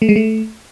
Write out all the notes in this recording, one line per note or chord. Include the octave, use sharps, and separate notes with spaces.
A3
G#3
A3